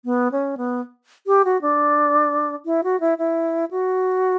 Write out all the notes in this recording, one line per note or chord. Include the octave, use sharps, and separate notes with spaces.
B3
C#4
B3
G4
F#4
D4
E4
F#4
E4
E4
F#4